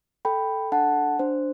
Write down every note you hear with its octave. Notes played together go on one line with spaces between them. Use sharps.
A4 G5 B5
D4 F#5 A5
D4 C5